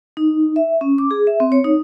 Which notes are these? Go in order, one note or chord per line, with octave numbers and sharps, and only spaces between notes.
D#4
E5
C#4
D6
G#4
E5
C4
C#5
D#4